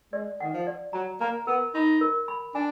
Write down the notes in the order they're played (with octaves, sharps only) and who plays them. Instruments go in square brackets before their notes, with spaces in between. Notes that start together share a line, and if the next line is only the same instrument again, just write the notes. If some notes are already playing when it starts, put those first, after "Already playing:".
[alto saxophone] G#3 [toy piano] D5
[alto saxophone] D#3 [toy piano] F#5
[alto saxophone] F3
[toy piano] D5
[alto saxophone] F#3 [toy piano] A#5
[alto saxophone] A#3 [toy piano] A#5
[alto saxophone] B3 [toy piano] A#4
[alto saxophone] D#4 [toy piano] B5
[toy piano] A#4
B5
[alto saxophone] D4 [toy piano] G#5